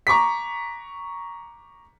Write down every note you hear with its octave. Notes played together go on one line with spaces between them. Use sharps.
A#5 C#6 D6 B6